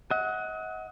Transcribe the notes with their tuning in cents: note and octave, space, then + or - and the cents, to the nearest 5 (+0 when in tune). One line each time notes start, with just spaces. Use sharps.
D#5 +40 F#5 +0